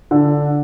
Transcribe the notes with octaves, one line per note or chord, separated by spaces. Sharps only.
D3